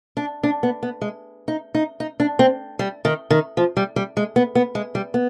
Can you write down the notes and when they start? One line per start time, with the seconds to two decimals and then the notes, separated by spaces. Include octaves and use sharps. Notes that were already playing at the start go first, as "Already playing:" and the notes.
0.17 D4
0.43 D4
0.63 B3
0.83 B3
1.01 G#3
1.48 D#4
1.75 D#4
2.00 D#4
2.20 D4
2.39 C4
2.79 G3
3.05 D#3
3.30 D#3
3.57 F3
3.77 G3
3.96 G3
4.17 G#3
4.36 B3
4.55 B3
4.75 G#3
4.95 G3
5.14 B3